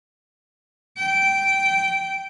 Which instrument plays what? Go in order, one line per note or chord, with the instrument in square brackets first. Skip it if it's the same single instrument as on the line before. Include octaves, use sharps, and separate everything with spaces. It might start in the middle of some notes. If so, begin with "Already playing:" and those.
[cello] G5